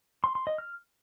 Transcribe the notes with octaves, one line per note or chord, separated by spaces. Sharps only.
C6
C6
D#5
F6